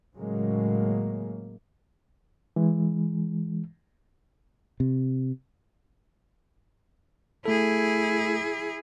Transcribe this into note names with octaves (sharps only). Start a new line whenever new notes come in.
A2 C#3 F#3 G#3 A#3
E3 G#3
C3
A3 E4 G#4 A4